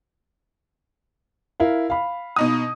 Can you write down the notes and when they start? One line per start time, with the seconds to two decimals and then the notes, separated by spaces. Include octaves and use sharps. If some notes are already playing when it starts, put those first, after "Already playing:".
1.60 E4 A#4 F5
1.90 F5 B5
2.36 B2 D#4 D#6